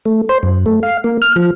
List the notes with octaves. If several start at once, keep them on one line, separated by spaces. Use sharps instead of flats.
A3
C5
F#2
A3
F5
A#3
F6
F3